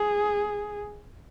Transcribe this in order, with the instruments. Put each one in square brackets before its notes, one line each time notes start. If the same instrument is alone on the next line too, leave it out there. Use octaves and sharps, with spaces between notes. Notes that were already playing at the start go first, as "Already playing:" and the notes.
Already playing: [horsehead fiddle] G#4